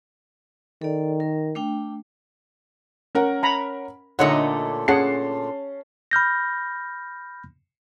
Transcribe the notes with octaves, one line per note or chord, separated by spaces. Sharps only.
D#3 A4 D5
A#4
A3 D4 G5
C#4 A#4 F#5
A#5 B5
A#2 D3 A3 D#4 C#5 D#5 F#5
C#4 G#4 F#5 A5 C7
B5 F6 G6 A#6